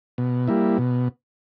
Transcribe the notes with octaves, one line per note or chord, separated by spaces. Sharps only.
B2
G3 A#3 E4
B2